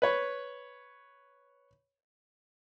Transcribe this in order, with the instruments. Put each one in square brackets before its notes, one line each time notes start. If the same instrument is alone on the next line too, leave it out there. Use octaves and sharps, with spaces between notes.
[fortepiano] B4 C#5